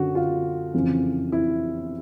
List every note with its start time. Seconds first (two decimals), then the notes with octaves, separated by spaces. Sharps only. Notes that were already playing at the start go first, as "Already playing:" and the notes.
Already playing: F#2 D3 F#4
0.15 F4
0.74 F2 C#3 E3
1.32 E4